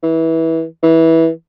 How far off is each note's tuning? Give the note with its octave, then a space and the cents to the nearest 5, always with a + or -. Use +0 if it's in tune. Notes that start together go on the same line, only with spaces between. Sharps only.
E3 -20
E3 -15